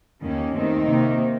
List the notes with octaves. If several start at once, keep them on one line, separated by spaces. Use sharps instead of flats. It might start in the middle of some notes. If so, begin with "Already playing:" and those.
D#2 D#3 A#3 C#4
D#2 D#3 A3 C4 D#4
C3 D#3 A#3